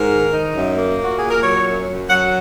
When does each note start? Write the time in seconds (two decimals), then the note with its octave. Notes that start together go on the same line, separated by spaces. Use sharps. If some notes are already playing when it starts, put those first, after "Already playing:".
Already playing: G#2 A#4
0.11 D#3
0.33 D#4
0.55 F#2
0.77 A#3
0.99 A#2 F#4
1.17 A#2 G#4
1.30 A#4
1.43 F#3 C#5
1.65 F#2
1.88 F#2
2.10 F#3 F#5